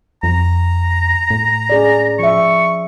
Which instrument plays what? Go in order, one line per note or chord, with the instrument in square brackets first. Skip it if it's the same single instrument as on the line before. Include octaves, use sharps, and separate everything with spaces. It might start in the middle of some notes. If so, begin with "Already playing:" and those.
[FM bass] F2 [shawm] A#5
[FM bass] A2
[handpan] C#4 G#4 D5
[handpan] F3 E5 [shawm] C#6